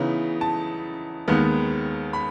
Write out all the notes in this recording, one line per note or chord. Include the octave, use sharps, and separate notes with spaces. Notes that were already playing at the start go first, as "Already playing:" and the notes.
Already playing: C#3 E3 B3 D#4
A5
D#2 D#3 G#3 B3 D#4
B5